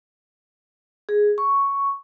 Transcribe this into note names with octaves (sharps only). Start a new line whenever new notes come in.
G#4
C#6